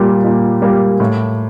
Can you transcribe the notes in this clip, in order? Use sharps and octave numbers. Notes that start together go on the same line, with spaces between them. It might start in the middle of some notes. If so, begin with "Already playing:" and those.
Already playing: A#2 G3 A#3
A#2
G3 A#3
A2